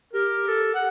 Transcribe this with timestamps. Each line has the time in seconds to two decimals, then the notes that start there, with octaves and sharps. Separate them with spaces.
0.13 G4 A#4
0.47 A4
0.74 F#5